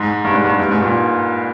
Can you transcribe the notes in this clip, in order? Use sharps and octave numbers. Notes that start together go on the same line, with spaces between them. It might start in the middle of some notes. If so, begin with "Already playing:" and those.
Already playing: G#2
G2
G#2
G2
G2
G#2
A#2